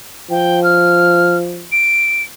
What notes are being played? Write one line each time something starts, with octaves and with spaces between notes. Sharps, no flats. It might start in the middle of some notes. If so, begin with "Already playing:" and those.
F3 G5
F6
D7